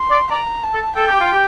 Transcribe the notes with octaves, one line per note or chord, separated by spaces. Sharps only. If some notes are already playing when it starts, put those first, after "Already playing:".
Already playing: C6
D5
D5 A#5
A5
A4
A4 G5
G4
F4
G4